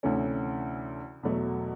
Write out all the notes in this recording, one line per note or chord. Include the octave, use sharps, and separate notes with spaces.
D2 C3 E3 A3 C#4
E2 B2 F#3 A3